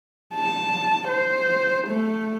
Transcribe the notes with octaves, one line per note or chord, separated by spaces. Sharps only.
A5
C5
A3